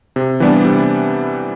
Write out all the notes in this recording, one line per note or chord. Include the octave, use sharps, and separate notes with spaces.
C3
E3 G3 B3 D4
C3